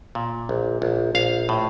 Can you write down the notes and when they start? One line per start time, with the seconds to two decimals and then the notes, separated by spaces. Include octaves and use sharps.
0.15 A#2
0.49 A#1
0.82 A#1
1.15 A#1 F5
1.49 A2